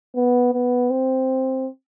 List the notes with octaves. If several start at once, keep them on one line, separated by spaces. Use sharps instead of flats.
B3
B3
C4